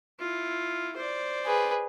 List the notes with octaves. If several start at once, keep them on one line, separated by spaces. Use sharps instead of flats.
E4 F4
C5 D5
G#4 B4